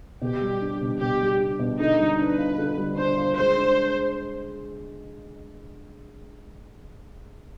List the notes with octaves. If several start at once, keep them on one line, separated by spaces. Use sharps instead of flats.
B2 G4
G3
D4
B2
B2 G4
G3
D4
B2
D3 D#4
G3
D4 B4
F4
D3
G3
D4 C5
F4
G#3 C5
D4